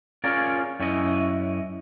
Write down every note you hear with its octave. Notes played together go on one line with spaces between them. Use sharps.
C#4 F4 G#4 A#4 D5
F#2 C#4 E4 D#5